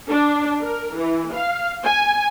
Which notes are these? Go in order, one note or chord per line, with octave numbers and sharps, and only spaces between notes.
D4
A#4
E3
F5
G#5